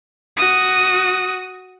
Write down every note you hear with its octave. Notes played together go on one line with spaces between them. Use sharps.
F#4 D#6